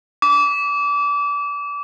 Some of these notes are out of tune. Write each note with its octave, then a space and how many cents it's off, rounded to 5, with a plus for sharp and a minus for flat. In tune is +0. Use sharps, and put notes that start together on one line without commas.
D6 -30